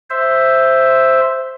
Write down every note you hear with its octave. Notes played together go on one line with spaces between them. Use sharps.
C5 E5